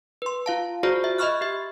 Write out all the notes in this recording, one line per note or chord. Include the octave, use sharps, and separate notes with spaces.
B4 C6
F4 F5 A5
F4 F#4 G#4 C5 D5
E5
D#5 E5 B5 C#6 F6 F#6
G4 E5